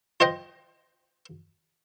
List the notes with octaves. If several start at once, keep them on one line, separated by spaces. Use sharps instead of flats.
F4 C5 D#5 G5